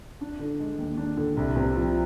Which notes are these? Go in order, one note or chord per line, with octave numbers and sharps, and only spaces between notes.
D4
D3
G#3
D#2
D4
D3
C2
C3
F3